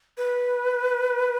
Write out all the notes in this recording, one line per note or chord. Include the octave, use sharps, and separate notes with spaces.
B4